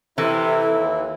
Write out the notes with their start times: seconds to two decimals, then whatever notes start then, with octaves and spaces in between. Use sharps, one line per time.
0.18 C3 E3 E4 A4
0.70 D#2